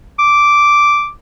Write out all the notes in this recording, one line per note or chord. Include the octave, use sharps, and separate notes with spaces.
D6